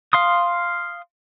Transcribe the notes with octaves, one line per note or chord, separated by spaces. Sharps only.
F5 C6 D#6